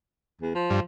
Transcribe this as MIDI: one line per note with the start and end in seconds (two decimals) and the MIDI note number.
0.41 0.54 40
0.55 0.81 53
0.70 0.80 43